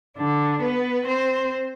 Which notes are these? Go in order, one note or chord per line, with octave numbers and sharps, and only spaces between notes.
D3 D4
B3 B4
C4 C5